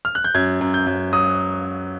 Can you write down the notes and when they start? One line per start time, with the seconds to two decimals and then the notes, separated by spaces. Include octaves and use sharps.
0.05 F6
0.15 F#6
0.24 G6
0.35 F#2 G#6
0.61 F#2
0.74 G6
0.87 F#2
1.13 F#3 D#6